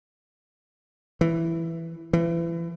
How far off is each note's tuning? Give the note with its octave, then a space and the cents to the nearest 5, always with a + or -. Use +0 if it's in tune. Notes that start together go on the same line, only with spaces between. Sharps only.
E3 +5
E3 +30